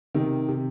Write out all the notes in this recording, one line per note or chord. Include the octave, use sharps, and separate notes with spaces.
C3 D#3
C3